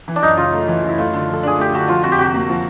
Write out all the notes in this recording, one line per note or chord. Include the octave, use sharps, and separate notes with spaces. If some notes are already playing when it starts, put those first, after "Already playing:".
E3
D4
F#2 D#4
C#3 F4
A3
E3
F#2
E4
A3 F4
D3
F3 A4
D4 G#4
A3 G4
D3 F#4
F3 F4
F2 F#4
G4
C3 F#4
A#3
F3